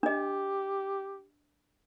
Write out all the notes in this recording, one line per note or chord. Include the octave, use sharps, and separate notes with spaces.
D4 G4 D#5